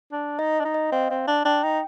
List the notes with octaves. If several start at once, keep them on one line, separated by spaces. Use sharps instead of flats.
D4
D#4 D#5
D4
D#4
D#5
C4 F5
C4
D4
D4 G5
D#4 G5